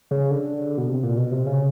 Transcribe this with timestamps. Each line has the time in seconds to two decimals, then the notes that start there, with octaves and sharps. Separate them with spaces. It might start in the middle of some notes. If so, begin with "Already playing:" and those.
0.11 C#3
0.31 D3
0.78 B2
0.89 C3
1.03 A#2
1.17 B2
1.32 C3
1.47 C#3